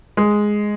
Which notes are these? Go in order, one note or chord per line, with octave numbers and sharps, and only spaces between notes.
G#3